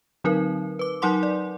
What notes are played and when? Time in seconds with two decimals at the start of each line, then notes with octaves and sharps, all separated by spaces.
0.24 D3 F#3 C4 D#4 A#4
0.79 B4 D6
1.02 F#3 D#4 A#4 F#5 C6 D6
1.23 D5